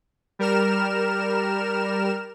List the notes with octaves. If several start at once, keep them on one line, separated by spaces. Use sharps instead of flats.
G3 A#4 F6 E7